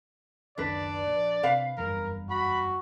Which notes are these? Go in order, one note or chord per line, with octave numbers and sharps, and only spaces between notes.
F#1 C#2 D#3 D4 B4 D5
A#1
C3 B4 F5
F#1 E2 G2 A#4
F#4 B5